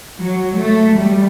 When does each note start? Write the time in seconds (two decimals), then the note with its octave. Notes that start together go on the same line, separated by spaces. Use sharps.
0.19 F#3
0.59 A3
0.98 G3